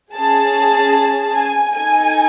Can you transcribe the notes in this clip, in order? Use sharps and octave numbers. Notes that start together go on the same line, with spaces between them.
C#4 G#4 A5
G#5
D#4 A4 G#5